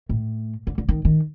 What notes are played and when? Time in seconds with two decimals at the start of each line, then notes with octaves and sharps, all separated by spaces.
0.09 A2
0.67 D3
0.78 D3
0.89 D#3
1.05 D#3